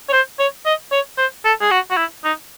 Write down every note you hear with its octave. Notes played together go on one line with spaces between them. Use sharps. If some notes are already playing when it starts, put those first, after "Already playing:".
C#5
C5
C#5
D#5
C#5
C5
A4
G#4
F#4
F#4
E4
D#4